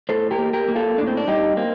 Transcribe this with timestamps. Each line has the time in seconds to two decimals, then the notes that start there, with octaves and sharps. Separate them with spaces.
0.09 A2 A4 C5
0.31 G4 A#4
0.38 A#3
0.53 G4 A#4
0.68 A#3
0.76 F4 A4
0.98 A2 D4
1.07 C4
1.17 D4
1.28 G3 D#4 G4
1.57 A#3 C4